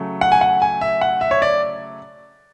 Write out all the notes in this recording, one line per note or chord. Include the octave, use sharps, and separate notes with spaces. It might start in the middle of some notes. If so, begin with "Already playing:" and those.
Already playing: C#3 F#3 A3
F#5
G#5
F#5
G#5
E5
F#5
E5
C#5
D5